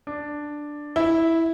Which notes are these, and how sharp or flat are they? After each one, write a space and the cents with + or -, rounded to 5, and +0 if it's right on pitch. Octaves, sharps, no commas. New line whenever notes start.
D4 +5
E4 -5